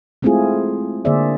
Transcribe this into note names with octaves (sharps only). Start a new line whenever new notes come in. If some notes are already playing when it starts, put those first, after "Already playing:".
G#3 A3 C4 E4 F4 G#4
D3 A#3 G#4 C5 D5 E5